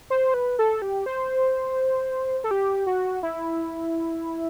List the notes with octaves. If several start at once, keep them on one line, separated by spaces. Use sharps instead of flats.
C5
B4
A4
G4
C5
A4
G4
F#4
E4